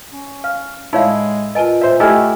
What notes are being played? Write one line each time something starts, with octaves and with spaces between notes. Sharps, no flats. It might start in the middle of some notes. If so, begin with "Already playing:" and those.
C#4
F5 F6
A2 G#3 D#4 E4 C#5 F5
F4 A#4 B4 D#5 G#5 A5
A#2 C5 D5 E5
A3 E4 G4 A4 D#5 G#5 F6 G#6